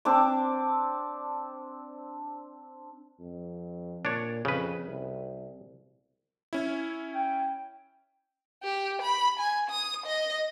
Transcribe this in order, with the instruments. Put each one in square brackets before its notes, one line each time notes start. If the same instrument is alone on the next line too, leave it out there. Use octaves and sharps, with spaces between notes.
[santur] C4 D4 D6
[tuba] F2
[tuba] A#2 [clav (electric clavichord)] D4 C#5
[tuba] F2 [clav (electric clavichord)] C#3 B4
[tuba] C2
[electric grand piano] C#4 E4
[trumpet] G5
[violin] G4
B5
G#5
D#6
D#5